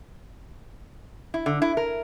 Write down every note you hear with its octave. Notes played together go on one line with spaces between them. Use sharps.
E4
D3
E4
A#4